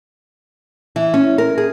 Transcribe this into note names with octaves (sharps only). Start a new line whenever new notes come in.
E3
C#4
A#4
G#4